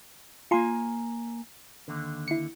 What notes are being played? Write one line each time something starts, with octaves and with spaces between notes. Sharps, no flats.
A#3 F4 G#5 C6
D#2 D3
E4 C#7